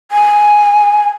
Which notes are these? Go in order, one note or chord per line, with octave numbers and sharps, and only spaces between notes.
G#5